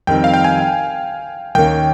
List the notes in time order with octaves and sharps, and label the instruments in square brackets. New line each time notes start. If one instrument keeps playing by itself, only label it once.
[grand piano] F2 D#3 G3 C4 [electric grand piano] G5
[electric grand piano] F5
G5
G#5
[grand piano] D#2 D#3 A#3 C#4 [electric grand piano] G5